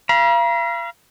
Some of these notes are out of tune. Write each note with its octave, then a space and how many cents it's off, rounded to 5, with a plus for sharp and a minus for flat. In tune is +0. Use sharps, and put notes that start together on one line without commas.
F5 -35 A#5 +45